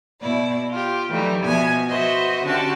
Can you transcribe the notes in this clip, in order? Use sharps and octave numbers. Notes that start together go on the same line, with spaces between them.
B2 E4 D5
F4 G4
E3 F#3 G3 A3 D#4
B2 F3 B3 E5 G#5
F#4 B4 C5 D#5 E5
D3 C#4 F#4 G4 A5